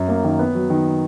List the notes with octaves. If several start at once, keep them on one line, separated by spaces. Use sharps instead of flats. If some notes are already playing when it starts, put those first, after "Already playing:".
Already playing: F#2
A#3
D#3
B3
F#3
D#3